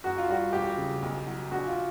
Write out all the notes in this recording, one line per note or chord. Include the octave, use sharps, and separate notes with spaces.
F#2 F#4
F4
G3 F#4
E1 G4
C#3
B1
F#3
A#1 F#4
F4